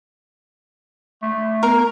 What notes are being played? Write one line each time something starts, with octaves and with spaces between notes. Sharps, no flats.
A3
B3 A#4